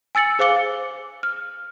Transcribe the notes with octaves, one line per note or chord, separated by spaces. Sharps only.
G#5 E6 A6 C#7 F#7
G#4 C5 F5 D6 C#7 G7
F6